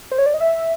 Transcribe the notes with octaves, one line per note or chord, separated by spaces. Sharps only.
C5
C#5
D5
D#5
E5